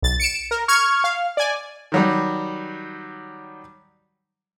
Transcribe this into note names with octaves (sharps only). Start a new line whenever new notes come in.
B1 A6
C#7 D7 E7
A#4
C#6 F6 G#6
F5
D5 G#5
D#3 F#3 G3